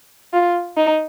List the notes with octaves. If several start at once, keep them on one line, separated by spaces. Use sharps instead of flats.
F4
D#4